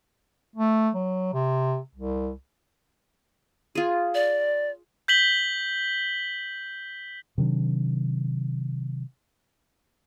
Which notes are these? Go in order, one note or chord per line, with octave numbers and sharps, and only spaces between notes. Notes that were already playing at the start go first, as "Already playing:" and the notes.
A3
F#3
C3
C2
F4 G#4
D5
G6 B6 F#7 G7
C3 D#3 F#3 D4